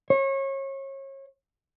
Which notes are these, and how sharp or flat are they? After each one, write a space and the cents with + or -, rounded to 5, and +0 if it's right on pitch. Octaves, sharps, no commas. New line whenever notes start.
C#5 -30